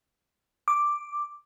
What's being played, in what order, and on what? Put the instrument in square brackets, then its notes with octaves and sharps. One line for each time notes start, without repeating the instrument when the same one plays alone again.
[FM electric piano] D6